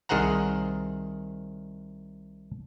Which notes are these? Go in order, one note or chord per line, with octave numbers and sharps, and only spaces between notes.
C2 D#3 G#4 C5 F#5 A#5